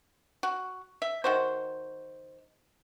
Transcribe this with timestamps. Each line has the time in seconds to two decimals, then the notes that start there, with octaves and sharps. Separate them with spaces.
0.43 F#4
1.02 E5
1.24 D#3 F#4 C5